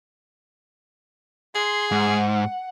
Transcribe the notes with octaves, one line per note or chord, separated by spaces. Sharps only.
G#4 C6
G#2 F#5